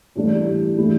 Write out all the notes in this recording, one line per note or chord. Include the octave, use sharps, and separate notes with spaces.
A2 E3 G3 D4 G4
E3 A3 E4 G4